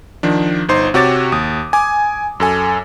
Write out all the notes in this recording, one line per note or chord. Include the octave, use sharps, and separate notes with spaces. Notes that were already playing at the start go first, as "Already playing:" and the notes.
D#3 F3 D4
G1 D#4 C5 C6
C3 F#4 G4 C#5 D6 A6
D#2 D#6
G#5 D6
F#2 A4 G#5